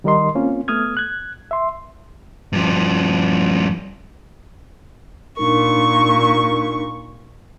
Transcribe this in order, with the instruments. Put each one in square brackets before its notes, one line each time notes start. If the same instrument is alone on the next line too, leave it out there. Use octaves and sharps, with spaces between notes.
[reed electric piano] D#3 G3 D#4 A#4 D#5 C6
A#3 C4 C#4 F4
A3 B3 D#6 F6 G#6
F#6 G#6
E5 C6
[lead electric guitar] G2 F3
[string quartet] A#2 C#6 [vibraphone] D4 D#4 A#4